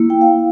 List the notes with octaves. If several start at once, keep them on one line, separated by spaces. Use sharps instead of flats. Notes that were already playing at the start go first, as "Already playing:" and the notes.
Already playing: A#3 E4
G5
F5